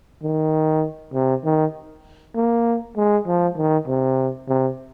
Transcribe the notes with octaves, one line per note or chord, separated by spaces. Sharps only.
D#3
C3
D#3
A#3
G#3
F3
D#3
C3
C3